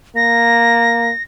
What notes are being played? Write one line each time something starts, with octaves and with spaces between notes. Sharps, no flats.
A#3 A#6